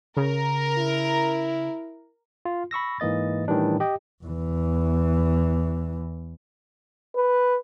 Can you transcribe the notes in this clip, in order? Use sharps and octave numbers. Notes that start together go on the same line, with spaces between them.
C#3 A#4
E4
F4
B5 C#6 E6 A#6
G#2 E3 A#3 D#5 A6
A2 D#3 E3 G3 D4
G4 D#5 G5
E2 E3
B4